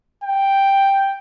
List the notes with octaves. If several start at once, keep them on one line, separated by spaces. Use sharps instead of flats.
G5